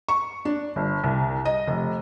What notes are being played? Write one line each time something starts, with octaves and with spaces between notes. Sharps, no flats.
C#6
D4
G1
C2
D#5
F1